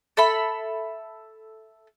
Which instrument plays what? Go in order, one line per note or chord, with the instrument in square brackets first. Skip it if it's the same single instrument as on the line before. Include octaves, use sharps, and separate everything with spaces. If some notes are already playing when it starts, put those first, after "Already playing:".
[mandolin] A4 E5 B5